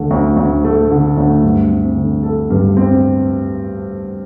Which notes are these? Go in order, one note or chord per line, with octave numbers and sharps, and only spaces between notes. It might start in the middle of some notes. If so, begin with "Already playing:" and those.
Already playing: D2 D3 A3
D2
D2
A3
D3
D2
G2
C4
D3
A4
G2
C4